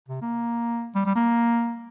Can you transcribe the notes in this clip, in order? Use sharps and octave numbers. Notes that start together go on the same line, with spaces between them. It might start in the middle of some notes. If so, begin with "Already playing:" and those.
C3
A#3
G3
G3
A#3